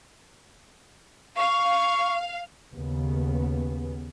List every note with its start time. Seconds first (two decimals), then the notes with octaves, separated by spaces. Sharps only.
1.37 F5 C#6
2.74 D#2 C#3 B3